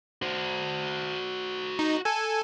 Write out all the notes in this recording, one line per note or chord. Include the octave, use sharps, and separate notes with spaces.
F#4 C5
D#4
A4 G#5